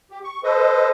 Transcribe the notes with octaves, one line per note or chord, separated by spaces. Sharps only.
G4
C#6
A4 B4 C5 D#5